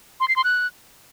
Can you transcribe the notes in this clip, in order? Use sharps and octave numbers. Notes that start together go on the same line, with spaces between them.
C6
C7
C6
F#6